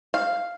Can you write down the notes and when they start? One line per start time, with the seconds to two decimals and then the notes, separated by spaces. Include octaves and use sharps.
0.14 F5